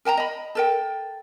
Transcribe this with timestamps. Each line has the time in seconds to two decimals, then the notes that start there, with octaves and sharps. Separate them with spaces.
0.05 A#4 G5 A5 A#5
0.17 D#5 B5
0.55 A4 A#4 G5